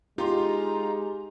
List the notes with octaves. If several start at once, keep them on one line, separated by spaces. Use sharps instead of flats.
G#3 D#4 F4 G4 A#5 C6